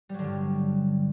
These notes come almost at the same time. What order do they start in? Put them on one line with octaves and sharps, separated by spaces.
G3 F#3 D3 G2